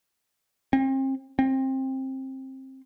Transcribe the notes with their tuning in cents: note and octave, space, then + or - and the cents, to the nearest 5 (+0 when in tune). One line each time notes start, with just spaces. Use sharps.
C4 +35
C4 +20